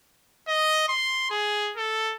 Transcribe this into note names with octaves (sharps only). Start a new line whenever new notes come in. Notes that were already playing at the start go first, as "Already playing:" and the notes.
D#5
C6
G#4
A4